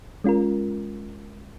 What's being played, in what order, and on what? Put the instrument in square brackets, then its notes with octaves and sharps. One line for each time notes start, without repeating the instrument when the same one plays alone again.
[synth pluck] G#3 C#4 F4 A#4